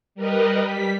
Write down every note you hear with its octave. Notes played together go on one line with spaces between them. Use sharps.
G3 A#4 B4 D#5
G3 B6